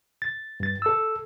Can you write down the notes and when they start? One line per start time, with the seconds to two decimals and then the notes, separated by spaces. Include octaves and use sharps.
0.22 A6
0.60 G2 A6
0.82 A4 E6